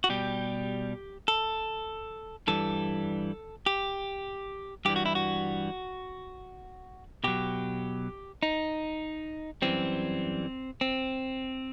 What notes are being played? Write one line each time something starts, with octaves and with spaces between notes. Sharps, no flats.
F#4
B2 G3 G4
A4
G2 E3 G3 A4
G4
G2 E3 G3 G4
F#4
E4
F#4
B2 F#3 G4
D#4
F#2 E3 G3 C4
C4